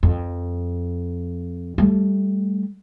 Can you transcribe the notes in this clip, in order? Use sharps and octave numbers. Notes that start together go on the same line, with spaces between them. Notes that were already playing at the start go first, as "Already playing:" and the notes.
F2
G3 A3